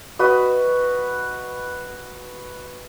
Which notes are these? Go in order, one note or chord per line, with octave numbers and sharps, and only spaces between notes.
F#4 B4 D#5